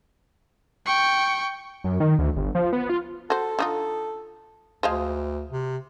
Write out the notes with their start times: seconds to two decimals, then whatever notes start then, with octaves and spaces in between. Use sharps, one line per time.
0.85 G5 C#6
1.84 F#2
2.00 D#3
2.19 D2
2.37 G1
2.55 F3
2.73 B3
2.89 F4
3.30 F#4 A4 C5
3.59 D3 D#4 F4
4.83 D2 F3 G#3 F5
5.51 C3